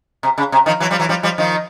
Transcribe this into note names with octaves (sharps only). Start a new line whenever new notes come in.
C3
C#3
C3
D#3 F3
E3 F#3
F3 G3
E3 F#3
F3 G3
F3 G3
D#3 F3